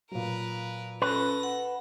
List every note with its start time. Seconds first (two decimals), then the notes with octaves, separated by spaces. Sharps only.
0.11 A#2 F#3 A#4 B4
1.02 C#4 A4 B4 A#6
1.43 F#5